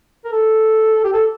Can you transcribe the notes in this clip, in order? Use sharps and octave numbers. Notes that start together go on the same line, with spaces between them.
A#4
A4
G4
A4